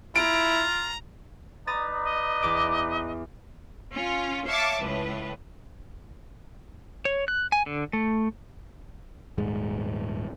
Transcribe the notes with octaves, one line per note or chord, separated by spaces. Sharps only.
E4 F4 A#5 D7
D#4 B4 D5 A#5 D#6 A6
D#5
E2 D6 D7
C#4 F4
C#5 E5 F5 A5 D6
C#2 A2 B4
C#5
F#6
G#5
D3
A3
D#1 G#2 G#3